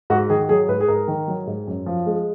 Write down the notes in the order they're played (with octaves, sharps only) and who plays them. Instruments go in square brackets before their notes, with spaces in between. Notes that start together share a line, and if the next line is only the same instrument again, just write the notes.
[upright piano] G#2 F#4
D#3 G#4
F#3 G#4
G#2 B4
G#4
G#2 A#4
D#3
F#3
G#2
F#2
F3
G#3